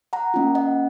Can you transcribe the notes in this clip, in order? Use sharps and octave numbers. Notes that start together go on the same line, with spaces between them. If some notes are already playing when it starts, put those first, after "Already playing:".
F#5 A#5
A#3 C#4 F4
D#5 F#5